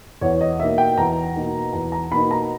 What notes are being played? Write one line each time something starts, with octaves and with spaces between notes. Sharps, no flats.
E2 C#5
D#5
B2 A#3 D#4 E5
G5
E2 A#5
B2 A#3 D#4
E2 A#5
A#5
B2 A#3 D#4 B5
A#5